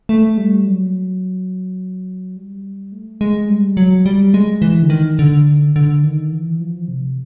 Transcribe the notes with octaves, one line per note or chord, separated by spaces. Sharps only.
A3
G3
F#3
G3
A3
G#3
G3
F#3
G3
G#3
E3
D3
D#3
D3
D3
D#3
E3
F3
C3